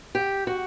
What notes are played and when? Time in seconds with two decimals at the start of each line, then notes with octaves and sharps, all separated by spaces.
0.15 G4
0.47 F#4